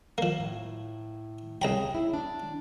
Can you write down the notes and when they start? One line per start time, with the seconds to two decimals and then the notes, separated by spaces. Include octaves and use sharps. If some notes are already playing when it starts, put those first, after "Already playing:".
0.18 F3 A#3
0.40 A2
1.62 C2 G#4 C#5 G5 A#5 B5
1.95 E4
2.14 D4